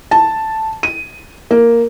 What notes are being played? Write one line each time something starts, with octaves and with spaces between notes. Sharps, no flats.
A5
D#7
A#3